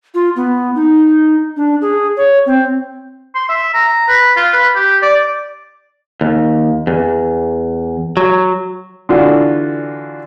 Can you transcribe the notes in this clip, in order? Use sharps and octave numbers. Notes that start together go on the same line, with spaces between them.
F4
B3
D#4
D4
G#4
C#5
C4
C6
E5
A#5
B4
F4
B4
G4
D5
D#2
E2
F#3
D3 E3 D4 F4 F#4